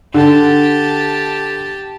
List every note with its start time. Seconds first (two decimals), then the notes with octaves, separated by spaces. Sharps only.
0.14 D3 G4 A5